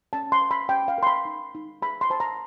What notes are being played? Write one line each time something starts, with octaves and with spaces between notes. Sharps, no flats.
C#4 A5
C6
A#4
B5
C#4 G5
F5
A#4 C6
B5
D#4
D#4
G#4 B5
C6
C5 A5
A#5